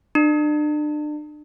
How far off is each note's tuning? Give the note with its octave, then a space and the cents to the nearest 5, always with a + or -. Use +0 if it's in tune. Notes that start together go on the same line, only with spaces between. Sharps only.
D4 +35